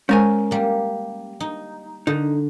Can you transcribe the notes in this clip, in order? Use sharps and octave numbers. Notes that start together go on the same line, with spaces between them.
G#3 C#4 A#4 C5 G#5 C#6
G3 A#3
D#4
D3 D#4